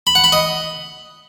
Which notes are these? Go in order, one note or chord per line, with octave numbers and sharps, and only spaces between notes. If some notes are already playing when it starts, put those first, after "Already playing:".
B5
F#5
B5
D#5